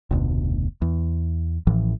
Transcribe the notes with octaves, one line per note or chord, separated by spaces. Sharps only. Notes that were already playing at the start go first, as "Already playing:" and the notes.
F1 D2 B2
E2
A1 A2 E3 F3